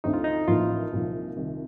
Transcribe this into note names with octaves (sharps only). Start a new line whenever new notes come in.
D2 D3 A3 C4 D#4
F4
D#4
A1 A2 F3 A#3 F4
C2 A#2 F3
C2 C3 D#3